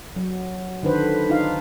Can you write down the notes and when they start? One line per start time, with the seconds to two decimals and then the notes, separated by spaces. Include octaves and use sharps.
0.16 F#3
0.83 D3 D#3 D4 B4 C5
1.29 D4 D#4 F4 F5